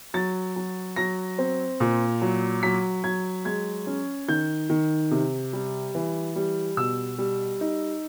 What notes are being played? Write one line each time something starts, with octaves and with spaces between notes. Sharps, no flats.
F#3 A6
F#3
F#3 A#6
C4
A#2
F#3
F#3 B6
F#3 G#6
G#3 G#6
C#4
D#3 G6
D#3
C3
G3
E3
G3
B2 E6
G3
D#4